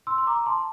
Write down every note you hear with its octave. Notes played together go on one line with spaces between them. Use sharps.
C6 E6
C6
A#5 D6
A5 C6